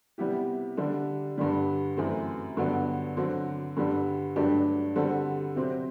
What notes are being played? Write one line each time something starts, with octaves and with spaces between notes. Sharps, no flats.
C3 G3 B3 E4 G4
D3 G3 D4
G2 D3 G3
F#2 E3 A3 C4
G2 D3 F#3 B3 D4
D3 F#3 C4
G2 D3 G3
G2 F#3 A3 D4 G4
D3 G3 C4 F#4 A4
C3 F#3 C4